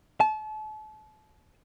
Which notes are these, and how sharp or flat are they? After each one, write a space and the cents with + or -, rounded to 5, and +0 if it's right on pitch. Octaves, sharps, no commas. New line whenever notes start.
A5 -35